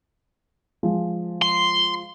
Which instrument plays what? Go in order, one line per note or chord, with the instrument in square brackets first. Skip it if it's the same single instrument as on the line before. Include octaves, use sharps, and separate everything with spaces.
[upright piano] F3 G#3
[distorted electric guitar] C6